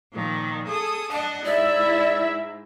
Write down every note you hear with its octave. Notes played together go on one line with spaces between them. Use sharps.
A#2 D#3 F3
G#4 A4 D#6
D4 D#5 F#5 A5
G#2 E4 D5 E5